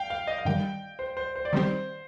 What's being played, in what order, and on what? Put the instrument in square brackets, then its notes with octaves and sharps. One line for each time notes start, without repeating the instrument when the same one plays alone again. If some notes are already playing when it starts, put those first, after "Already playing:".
Already playing: [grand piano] F5 G5
F5
D#5
F5
[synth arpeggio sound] G2 D#3 G3 [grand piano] G5
[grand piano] C5
C5
C5
D5
[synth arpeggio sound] D#3 G3 C4 G4 [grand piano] C5